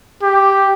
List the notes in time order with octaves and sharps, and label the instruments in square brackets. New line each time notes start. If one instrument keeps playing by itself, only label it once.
[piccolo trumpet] G4